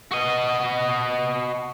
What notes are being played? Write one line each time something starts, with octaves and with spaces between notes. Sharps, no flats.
F#4 D#5